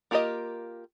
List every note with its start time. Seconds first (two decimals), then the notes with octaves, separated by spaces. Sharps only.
0.11 A#3 F4 G4 A#4 D#5